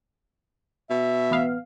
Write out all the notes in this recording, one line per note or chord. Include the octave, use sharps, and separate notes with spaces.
B2 E5
A1 B3 F5